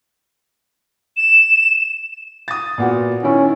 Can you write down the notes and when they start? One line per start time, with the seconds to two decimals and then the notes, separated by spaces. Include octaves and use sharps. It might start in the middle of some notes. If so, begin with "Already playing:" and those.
1.17 E7
2.48 D#6 A6
2.78 A#2 B3 F#4
3.23 D#3 C#4 E4